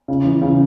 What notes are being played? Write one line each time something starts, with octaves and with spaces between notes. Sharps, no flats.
C#3
E3
C#3